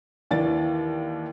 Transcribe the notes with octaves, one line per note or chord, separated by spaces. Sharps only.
D#2 E3 D5 A6